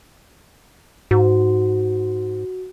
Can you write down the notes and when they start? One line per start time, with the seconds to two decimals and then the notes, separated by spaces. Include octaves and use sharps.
1.11 G#2 F#4